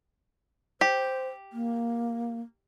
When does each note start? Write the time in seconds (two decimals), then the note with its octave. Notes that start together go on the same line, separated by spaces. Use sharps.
0.81 G4 C5
1.53 A#3